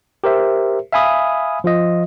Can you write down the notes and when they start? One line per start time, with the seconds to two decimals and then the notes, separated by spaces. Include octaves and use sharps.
0.24 G4 A#4 C5 E5
0.93 E5 F5 G#5 B5 D#6
1.64 F3 F4 D#5